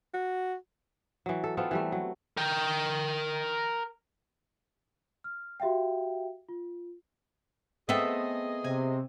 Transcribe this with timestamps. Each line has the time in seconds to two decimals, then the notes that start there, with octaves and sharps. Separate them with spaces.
0.14 F#4
1.26 E3 F#3
1.44 A4
1.57 B3 C4 F4 A4
1.71 E3 G3 A3
1.92 F#3
2.37 A#4 G5
5.24 F6
5.60 F#4 G4 E5 F5 G5
6.49 F4
7.89 A3 B3 C4 G#4 A4 D#5 E5
8.64 C3 G#5